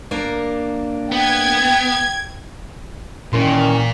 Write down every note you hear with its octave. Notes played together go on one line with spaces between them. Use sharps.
A#3 D4 A#4
B3 G5 G#6
A#2 D#3 E3 C#4 A#4 C6